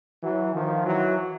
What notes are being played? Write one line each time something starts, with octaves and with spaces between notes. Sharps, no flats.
E3 F#3
D#3 F3
E3 F#3